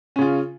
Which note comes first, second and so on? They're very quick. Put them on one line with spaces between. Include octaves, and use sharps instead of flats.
C#4 C#3 F4